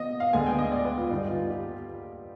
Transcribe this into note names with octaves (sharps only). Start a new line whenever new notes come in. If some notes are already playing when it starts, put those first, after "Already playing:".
Already playing: B2 B3 D#5
F5
D2 D3 G#3 B3 G#5
G5
D#5
D5
B4
F4
G2 D3 G3 B3 D#4
F4
G4